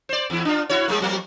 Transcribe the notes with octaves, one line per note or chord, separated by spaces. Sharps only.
C5 D5
E2 E4
D4 F4
E4 F#4 C#5
G3 G#3 A#3
F2 F#3 A#3